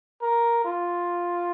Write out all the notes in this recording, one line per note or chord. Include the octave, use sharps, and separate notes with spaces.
A#4
F4